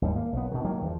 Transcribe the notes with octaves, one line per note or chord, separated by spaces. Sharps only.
D#2 G#2 G3
A#3
B1 B3
B2 D#3
D#3 F#3 A#3
E2 F3